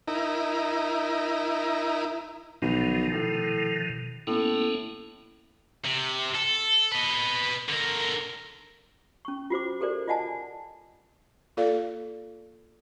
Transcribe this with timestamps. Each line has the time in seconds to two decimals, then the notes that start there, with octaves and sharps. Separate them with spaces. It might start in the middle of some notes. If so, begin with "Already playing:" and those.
0.08 D#4 E4 A#4
2.62 B1 B2 D#3 F3
3.12 A2
4.27 A2 A#3 B3 C#4
5.85 C3
6.35 A4
6.92 B4 D#5
7.68 D3 A#4
9.25 C#4 C#6
9.50 F4 F#4 C5 D6
9.80 G4 A4 A#4 C5 D5
10.08 F4 D5 D#5 F#5 G#5 A5
11.57 A#3 F4 A4 D5 F5